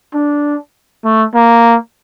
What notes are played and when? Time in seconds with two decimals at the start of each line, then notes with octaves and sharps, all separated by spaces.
0.14 D4
1.04 A3
1.34 A#3